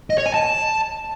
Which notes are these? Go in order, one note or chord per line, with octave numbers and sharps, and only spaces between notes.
D#5
C#5
G#5
A5